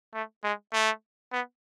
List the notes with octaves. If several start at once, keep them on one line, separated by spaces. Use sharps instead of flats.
A3
G#3
A3
B3